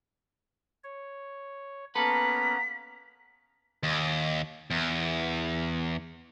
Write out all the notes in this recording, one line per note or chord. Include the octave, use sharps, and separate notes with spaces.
C#5
A#3 B3 C#4 A4 B4 A#5 B6
D#2
E2